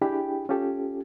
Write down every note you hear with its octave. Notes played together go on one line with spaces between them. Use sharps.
D4 E4 G4 G#4 G5 B5
C#4 F4 G4 A4